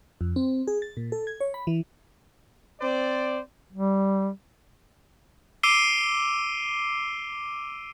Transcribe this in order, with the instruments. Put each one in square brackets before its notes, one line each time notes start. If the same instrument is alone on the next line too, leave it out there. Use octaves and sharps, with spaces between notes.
[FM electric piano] F2
C4
G#4
A6
A#2
A4
G#6
C#5
B5
E3
[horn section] C4 C5 D5
[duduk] G3
[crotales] D6 E6 C7 D7 D#7 G7